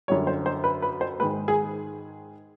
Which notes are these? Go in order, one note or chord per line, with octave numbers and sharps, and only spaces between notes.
F#2 D3 G3 C#5
C5
C5
B4
B4
C5
G#2 D#3 G#3 B4
G#4